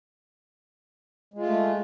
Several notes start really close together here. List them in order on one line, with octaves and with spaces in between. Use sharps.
G#3 F4 A3